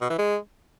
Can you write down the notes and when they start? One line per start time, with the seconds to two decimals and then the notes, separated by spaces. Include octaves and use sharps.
0.01 B2
0.10 E3
0.18 G#3